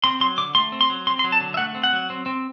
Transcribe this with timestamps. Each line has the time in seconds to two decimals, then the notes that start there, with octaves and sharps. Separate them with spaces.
0.04 C4 C6
0.20 F#3 C6
0.38 D3 D6
0.55 A3 C6
0.72 C4
0.81 C6
0.90 F#3
1.07 C4 C6
1.19 C6
1.24 F#3
1.32 A5
1.41 D3
1.54 E5
1.57 A3 F#5
1.75 C4
1.84 F#5
1.93 F#3
2.10 C4
2.26 C4